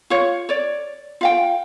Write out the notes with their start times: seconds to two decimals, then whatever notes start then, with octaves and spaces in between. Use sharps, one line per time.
0.10 F4 C#5
0.49 C#5 D5
1.21 F4 F5 G5